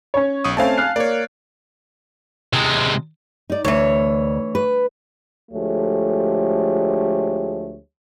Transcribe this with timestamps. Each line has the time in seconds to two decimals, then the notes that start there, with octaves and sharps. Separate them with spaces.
0.14 C#4 C#5
0.44 B1 C#6 D#6
0.57 A3 C4 C#4 F5 G#5 A5
0.77 F6 F#6 C7
0.96 A#3 C#5 D5
2.53 C3 G#3
3.50 D#4 D5
3.65 D2 E3 C#5
4.55 B4
5.52 D2 F3 G#3 A3 G4 C#5